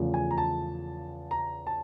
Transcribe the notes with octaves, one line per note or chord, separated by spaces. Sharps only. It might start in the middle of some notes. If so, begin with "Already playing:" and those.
Already playing: E2 C#3 F3 A3
G#5
A#5
A5
A#5
A5